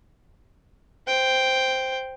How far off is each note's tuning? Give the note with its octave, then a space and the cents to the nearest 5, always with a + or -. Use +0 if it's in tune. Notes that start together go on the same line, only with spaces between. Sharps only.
C5 +0 G5 +0